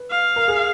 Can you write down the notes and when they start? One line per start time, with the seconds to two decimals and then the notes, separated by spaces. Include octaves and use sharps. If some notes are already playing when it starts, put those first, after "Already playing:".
Already playing: B4
0.11 F5
0.36 A#4
0.48 G#4